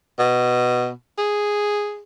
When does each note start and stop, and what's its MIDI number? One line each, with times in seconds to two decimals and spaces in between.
0.19 0.90 47
1.18 2.02 68